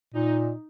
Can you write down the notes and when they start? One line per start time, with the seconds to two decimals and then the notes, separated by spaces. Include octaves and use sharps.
0.14 A#2 D#4